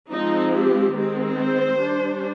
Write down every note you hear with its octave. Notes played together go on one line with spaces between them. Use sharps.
F3 G#3 C4 D#4
G4
D#3 G#3 C4
C5
G3 D4